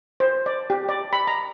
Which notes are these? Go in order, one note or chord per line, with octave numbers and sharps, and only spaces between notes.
C5
D5
G4
D5
B5
A#5